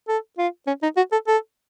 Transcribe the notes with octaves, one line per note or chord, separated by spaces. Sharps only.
A4
F4
C#4
D#4
F#4
A4
A4